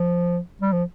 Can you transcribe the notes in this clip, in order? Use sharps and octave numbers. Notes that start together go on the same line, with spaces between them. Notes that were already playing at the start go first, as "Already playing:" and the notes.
Already playing: F3
G3
F3